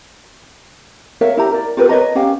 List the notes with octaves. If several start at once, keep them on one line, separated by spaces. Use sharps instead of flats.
A#4 C#5 E5 F5
E4 G4 A#5
A#4 D5
F4 G4 A#4 B4
B4 C#5 D#5 A#5
C#4 G4 F5 G5